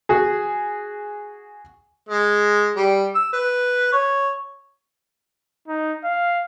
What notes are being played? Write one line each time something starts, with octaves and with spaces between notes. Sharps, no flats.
F#4 G#4
G#3
G3
E6
B4
C#5
D#4
F5